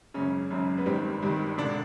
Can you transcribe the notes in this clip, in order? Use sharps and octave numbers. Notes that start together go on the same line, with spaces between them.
G#1 F#2 C#3 C#4
G#1 F#2 C#3
B3
G#1 G2 D#3 G3 C4
G#1 G2 D#3 G3
E1 D3 D4